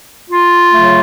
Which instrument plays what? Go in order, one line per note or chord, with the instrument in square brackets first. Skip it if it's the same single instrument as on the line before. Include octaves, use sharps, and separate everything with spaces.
[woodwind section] F4
C#3 F#3 A3